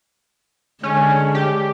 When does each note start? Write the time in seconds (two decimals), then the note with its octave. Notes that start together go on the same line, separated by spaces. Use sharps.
0.83 D3 G#3 C#4
1.34 G4